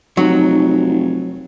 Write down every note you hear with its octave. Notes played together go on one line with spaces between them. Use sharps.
F1 F#3 D#4